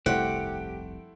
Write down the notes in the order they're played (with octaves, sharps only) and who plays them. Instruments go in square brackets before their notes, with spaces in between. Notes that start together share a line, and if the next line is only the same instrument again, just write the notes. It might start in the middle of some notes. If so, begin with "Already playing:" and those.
[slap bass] F1 C2 G2 [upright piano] A3 E4 C5 [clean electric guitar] G4 [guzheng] F#5